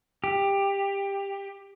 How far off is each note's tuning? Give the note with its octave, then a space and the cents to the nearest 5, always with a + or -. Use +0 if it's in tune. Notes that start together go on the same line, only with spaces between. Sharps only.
G4 +15